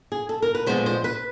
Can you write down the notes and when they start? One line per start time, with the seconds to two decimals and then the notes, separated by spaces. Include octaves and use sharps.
0.12 G#4
0.29 A4
0.42 A#4
0.55 B4
0.66 A#2 F3 G#3 B3 C5
0.86 C5
1.04 B4